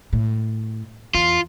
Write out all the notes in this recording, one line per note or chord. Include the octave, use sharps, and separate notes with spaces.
A2
E2 F4